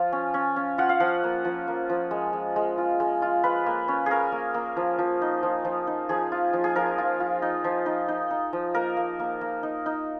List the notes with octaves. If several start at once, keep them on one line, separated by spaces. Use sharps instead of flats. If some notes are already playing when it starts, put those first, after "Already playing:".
Already playing: F3 F4
C#4
C#4
C#4
F4 F#5
F5
F3 F#5
A#3
F3
A#3
F3
G#3
G#3
G#3
F4
G#3
F4
F4 B4
A#3
C#4
C#4 G#4 A#4
A#3
A#3
F3
F3
D#4
F3
F3
D#4
F3 G#4
F4
F3
G#4
F3 A#4
F4
F4
D#4
F3
D#4
D#4
D#4
F3
A#3 A#4
A#3
A#3
A#3
D#4
D#4